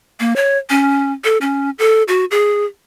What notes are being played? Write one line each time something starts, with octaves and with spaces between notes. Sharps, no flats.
A#3
C#5
C#4
A4
C#4
A4
F#4
G#4